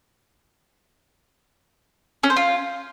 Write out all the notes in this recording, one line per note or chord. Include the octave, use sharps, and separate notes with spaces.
C#4
C5
F4